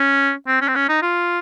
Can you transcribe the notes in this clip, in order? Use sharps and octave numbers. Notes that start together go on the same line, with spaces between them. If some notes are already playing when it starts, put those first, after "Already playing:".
Already playing: C#4
C4
C#4
C4
C#4
D#4
F4